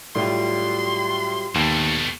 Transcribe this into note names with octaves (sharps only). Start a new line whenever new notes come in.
A2 F#3 G3 F4 C6
D#2 B2 A3